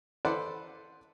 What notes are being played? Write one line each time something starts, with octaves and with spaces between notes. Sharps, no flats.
A4 B4 C5 D5 F#5